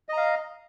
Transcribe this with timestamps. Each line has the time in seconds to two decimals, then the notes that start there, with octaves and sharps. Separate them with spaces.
0.09 D#5
0.13 A#5
0.17 F5